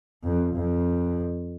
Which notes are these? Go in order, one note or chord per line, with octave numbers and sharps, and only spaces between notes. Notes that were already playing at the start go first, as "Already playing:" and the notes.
F2
F2